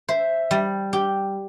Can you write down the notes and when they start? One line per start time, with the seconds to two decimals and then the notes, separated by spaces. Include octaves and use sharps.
0.09 C5 E5
0.51 G3
0.93 G4